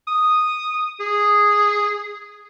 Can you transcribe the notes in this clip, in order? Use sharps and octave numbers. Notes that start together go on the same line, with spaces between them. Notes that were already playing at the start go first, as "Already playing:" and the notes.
D#6
G#4